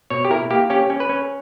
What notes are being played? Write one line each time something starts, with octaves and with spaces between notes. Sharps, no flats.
B2 C#5
G4
E4 A#4
A#3 G4
C#4 G4
C#4
B4
C#4